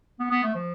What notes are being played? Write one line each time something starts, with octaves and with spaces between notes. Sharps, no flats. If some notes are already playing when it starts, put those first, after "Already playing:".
B3
B3
A3
F3